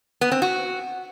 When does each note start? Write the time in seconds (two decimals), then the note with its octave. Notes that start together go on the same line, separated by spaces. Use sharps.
0.21 B3
0.32 C4
0.42 F#4